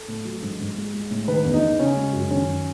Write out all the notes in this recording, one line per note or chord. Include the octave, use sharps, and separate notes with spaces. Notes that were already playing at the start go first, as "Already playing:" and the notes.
Already playing: A4
A2
F#3
G#2
G#2
G#3
G#3
A2
D#3 B4
E2
D#4
E2
C#3 C#4
G#3
F#2
D#3 C#4
F#2